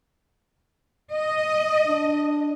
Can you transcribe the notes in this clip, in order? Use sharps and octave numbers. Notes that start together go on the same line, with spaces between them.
D#5
D4